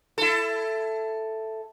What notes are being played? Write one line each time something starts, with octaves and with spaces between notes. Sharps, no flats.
E4 A4